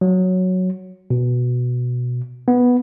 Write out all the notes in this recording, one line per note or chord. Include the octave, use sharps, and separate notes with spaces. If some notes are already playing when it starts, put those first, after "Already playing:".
F#3
B2
B3